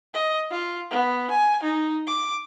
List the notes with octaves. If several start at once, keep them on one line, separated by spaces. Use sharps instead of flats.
D#5
F4
B3
G#5
D#4
D6